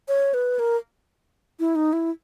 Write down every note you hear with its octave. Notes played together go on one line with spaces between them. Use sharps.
C#5
B4
A#4
E4
D#4
E4